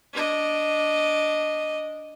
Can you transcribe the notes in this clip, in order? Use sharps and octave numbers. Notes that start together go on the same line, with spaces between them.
D4 D#5